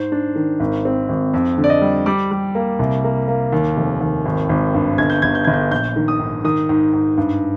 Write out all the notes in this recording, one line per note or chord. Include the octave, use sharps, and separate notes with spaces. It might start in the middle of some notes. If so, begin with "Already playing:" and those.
Already playing: G#2 C5
D4
D#3
G#1
C4
G#1
F2
D3
D5
D#5
G3
G3 D6
G3
A#3
C2
A#3
A#3
D#2
F1
D#2
G#1
G#1
G2
G1 G#6
G6
G1 G#6
G6
G1 G#6
G6
A#1 G6
D#3
D#6
G#2
D#3 D#6
G#2
G#2
G2